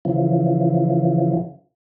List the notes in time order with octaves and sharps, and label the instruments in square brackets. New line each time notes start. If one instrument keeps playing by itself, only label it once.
[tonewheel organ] C#3 E3 F3